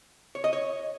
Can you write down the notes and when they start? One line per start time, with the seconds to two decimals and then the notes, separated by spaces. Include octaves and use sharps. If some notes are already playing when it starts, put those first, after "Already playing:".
0.35 C#5
0.44 D#5
0.53 C#5